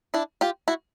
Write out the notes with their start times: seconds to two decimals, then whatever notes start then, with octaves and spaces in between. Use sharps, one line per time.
0.14 D4 E4
0.41 F4 G4
0.68 E4 F#4